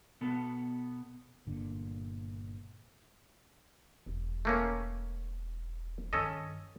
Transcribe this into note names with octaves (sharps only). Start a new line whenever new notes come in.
B2 B3 A4
G1 A#2 D3
E1
A3 A#3 C#4
G2 D#3 C#4 A4 D#5